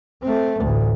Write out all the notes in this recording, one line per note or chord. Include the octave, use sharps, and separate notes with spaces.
A3 C4
A1 D2